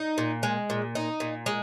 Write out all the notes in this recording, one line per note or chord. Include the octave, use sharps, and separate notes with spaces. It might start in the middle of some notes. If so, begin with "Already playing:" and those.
Already playing: D#4
A#2
G#3
A#2
D#4
A#2
G#3